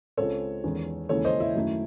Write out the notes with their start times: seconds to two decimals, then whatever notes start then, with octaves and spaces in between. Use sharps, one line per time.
0.17 C#2 C#3 G#3 C4 A4 C#5
0.64 E2 D#3 G#3 C#4
1.09 D#2 C#3 E3 G#3 C#4 A4 C#5
1.25 C5 D#5
1.40 E4
1.55 F#2 D#3 A3